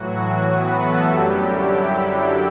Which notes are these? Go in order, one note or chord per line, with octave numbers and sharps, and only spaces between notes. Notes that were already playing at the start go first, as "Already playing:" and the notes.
Already playing: A2 E3 F#3 F#4
B3 B4
A3 A4
F#2 D3 F#3 G3 G4
E4
E4